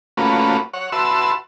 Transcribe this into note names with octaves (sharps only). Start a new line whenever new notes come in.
A3 A#3 C#4 F4 F#4 B4
C#5 F#5
F#4 B4 E5 A5 C6 E6